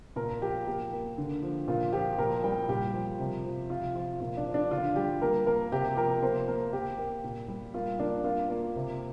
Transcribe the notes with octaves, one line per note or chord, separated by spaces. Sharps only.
A#2 A#4
F3 G4
A#3 G4
A#3
D3
F3
A#2 F4
F3 G4
A#2 A#4
G3 G5
A#2 G4
F3
C3
F3
C3 F4
F3 F4
A#2 F4
D4
F3
D4
D3 F4
G3 G4
A#3 A#4
A#3 A#4
C3 G4
F3 A#4
A#3 C5
A#3 A#4
A#3 G4
A#3
A#2
G3
A#3 F4
A#3 D4
A#3 F4
A#3
C3